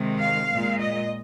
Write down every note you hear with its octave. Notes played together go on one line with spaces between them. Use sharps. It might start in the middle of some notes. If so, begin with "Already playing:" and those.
Already playing: C3 D#3 G#3
F5
A#2 G#3
D#5